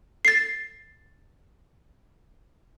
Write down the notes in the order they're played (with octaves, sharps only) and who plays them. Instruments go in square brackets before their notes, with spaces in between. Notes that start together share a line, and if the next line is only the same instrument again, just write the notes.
[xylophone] A6 C7